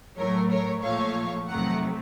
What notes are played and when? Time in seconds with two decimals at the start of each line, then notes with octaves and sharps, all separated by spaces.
0.17 A2 F#3 A3 A#4 C#5
0.50 A#4 C#5
0.82 A#2 F3 A3 C#5 F5
1.48 F2 C3 D#3 F#3 A3 F#5 A#5